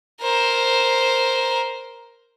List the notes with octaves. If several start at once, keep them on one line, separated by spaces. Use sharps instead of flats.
A#4 C5